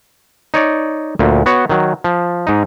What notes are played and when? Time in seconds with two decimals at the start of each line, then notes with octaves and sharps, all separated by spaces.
0.54 D#4 C#5 D5
1.19 D2 A#2
1.46 B3 F#4 C#5
1.69 D#3 F#3
2.04 F3
2.47 G#2 D#4